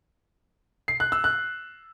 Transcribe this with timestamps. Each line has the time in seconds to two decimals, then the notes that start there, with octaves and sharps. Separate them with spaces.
0.88 C7
1.00 F#6
1.12 E6
1.24 F#6